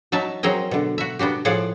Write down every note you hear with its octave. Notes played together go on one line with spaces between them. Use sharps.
F#3 D#4 E5 A5
F#3 C4 G#4 A#4 D#5
B2 D3
F#4 E5
B3 D4 F#4 G4
A2 F3 G#4 D5 F5 F#5